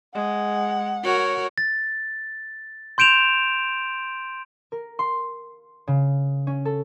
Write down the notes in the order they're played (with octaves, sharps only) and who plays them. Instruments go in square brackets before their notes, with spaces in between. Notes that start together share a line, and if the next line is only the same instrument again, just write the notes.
[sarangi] G#3 [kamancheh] F#5
[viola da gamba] F#4 A#4 [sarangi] C#5
[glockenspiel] A6
C6 G6 D7 E7 F7
[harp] A#4
C6
C#3
C#4
A4